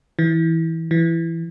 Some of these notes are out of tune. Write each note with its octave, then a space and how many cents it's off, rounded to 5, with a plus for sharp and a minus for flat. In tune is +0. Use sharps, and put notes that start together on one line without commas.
E3 -15
E3 +10